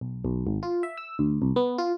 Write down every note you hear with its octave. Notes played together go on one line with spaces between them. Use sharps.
B1
B1
G#1
F4
E5
E6
D2
C2
B3
F4